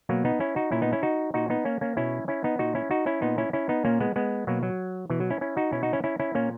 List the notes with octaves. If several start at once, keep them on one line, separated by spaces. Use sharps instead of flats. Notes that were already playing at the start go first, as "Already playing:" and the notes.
B2 F#3 A#3
B3 D#4
C#4 E4
D#4 F#4
A#2 C#4 E4
B3 D#4
C#4 E4
D#4 F#4
A#2 D#4 F#4
B3 D#4
A#3 C#4
A#3 C#4
B2 C#4 E4
C#4 E4
B3 D#4
A#2 D#4 F#4
C#4 E4
D#4 F#4
C#4 E4
A#2 B3 D#4
C#4 E4
C#4 E4
B3 D#4
A#2 A#3 C#4
G#3 B3
G#3 B3
B2 F#3 A#3
F#3
B2 E3
F#3
C#4 E4
C#4 E4
D#4 F#4
B2 C#4 E4
D#4 F#4
C#4 E4
C#4 E4
C#4 E4
A#2 A#3 C#4